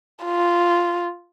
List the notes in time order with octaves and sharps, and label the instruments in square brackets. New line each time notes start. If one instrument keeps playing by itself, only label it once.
[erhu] F4